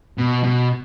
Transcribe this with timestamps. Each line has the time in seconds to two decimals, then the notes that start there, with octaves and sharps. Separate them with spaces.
0.18 B2
0.44 B2